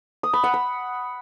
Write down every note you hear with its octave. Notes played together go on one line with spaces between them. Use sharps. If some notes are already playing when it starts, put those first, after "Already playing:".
D#6
B5
F#5
B5